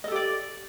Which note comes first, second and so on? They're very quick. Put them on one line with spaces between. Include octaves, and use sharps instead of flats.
D#5 A4 G4 D5